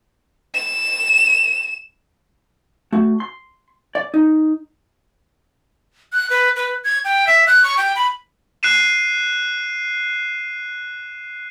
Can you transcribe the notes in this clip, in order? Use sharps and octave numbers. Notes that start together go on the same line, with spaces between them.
E7
A3 F#4
C6
D5
D#4
F#6
B4
B4
G#6
G5
E5
F#6
C#6
G5
B5
F#6 C7 D#7 E7